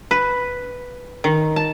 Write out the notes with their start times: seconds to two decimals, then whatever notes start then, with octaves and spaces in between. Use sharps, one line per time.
0.11 B4
1.24 D#3
1.56 A5